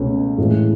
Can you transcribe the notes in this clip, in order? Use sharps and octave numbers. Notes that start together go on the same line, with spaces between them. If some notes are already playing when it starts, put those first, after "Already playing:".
Already playing: C#2 B2 A3 C#4
A2 E3 G#3